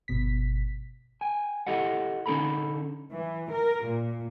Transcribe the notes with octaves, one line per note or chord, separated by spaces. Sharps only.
G1 B2 B6
G5 G#5
E4 G4 A4 D#5 F#5
D3 C#4 D#4 A4 A#5 B5
E3
A#4
A#2